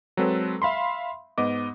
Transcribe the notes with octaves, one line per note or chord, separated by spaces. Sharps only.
F#3 G#3 C4 A4 B4
E5 F5 B5 C6
G#2 B3 D#5 D6